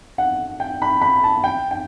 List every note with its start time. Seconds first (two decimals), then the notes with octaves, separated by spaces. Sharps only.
0.18 F#5
0.60 G5
0.82 B5
1.02 B5
1.24 A5
1.44 G5
1.71 G5